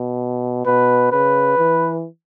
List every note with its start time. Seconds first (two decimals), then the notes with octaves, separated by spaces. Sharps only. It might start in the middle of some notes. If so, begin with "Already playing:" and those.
Already playing: B2
0.66 B2 B4
1.12 C#3 B4
1.58 E3